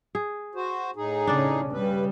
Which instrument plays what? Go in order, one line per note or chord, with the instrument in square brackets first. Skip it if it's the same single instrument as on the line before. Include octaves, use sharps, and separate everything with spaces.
[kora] G#4
[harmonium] F#4 C5
A2 D#4 G#4
[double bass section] C#3 C#4 [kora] D4 D5
[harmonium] G2 B4 [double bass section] C#3 G3